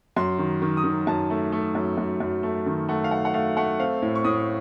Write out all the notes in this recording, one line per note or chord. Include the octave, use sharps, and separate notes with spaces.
F#2 C6
D#3
D#3
D#6
D#3
F#2 A5
A3
A3
F#2
F#2
F#2
A3
D#3
A3 F#5
F5
A3 F#5
F#5
A3 F5
A3 F#5
C4 F5
A2
C#6
A2 D#6